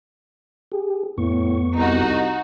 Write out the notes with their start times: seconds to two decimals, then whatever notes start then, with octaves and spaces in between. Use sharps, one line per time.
0.72 G4 G#4
1.18 F2 A2 B3 C#6
1.75 C2 D#4 F#4